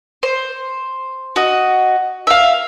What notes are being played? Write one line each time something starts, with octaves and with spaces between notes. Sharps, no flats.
C5
F#4 D#5
E5 F5